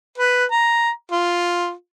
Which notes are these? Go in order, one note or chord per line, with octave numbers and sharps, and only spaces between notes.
B4
A#5
F4